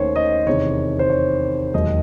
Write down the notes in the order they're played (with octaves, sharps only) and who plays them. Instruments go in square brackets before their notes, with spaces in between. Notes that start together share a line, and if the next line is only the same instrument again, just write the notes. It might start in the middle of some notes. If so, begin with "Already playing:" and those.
Already playing: [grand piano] D#2 D#3 A3 C#4 C5 C#5
D#5
E2 C3 D#3 C#5
C5
C#5
E1 D#2 D#3 F#3 D#5